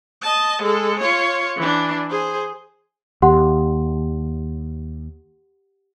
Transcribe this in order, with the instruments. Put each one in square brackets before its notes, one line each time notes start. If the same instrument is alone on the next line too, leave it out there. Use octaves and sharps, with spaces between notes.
[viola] D#5 A5
G#3 A4
F4 C#5
E3 D4
G#4 C5
[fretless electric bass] D#2 [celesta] G4 F#5 C6